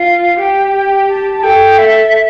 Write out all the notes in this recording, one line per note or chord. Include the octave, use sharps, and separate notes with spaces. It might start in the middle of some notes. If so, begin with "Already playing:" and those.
Already playing: F4 F5
G4 G5
A5
A5
A4 G5
E5